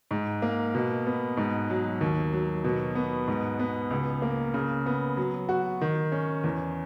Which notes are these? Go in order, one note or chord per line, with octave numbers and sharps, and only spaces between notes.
G#2
A#3
B2
B3
G#2
F#3
D#2
F#3
B2
B3
G#2
B3
C#2
A#3
C#3
B3
F#3
F#4
D#3
C#4
E2